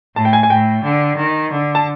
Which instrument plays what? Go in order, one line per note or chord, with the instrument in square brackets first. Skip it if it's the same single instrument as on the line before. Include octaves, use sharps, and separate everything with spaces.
[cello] A2 [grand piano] A5
[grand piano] G5
G#5
G#5
[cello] A2 [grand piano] G5
[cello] D3
D#3
D3
[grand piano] A5